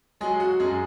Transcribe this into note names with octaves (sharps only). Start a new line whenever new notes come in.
F#3 G#3 G#4
F#4
F#2 G#3 G#4